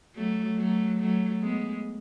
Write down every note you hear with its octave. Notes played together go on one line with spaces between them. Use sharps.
F#3 A3
F#3 A3
F#3 A3
G#3 B3